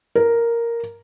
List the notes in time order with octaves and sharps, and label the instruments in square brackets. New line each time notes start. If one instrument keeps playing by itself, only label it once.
[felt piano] A#4